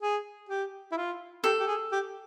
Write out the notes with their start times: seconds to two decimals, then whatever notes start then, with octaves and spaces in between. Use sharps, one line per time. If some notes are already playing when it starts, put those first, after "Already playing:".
0.02 G#4
0.49 G4
0.92 E4
0.97 F4
1.44 G4 A4
1.60 G4
1.67 G#4
1.92 G4